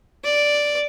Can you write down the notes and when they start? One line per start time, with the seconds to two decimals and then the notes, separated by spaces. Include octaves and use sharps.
0.24 D5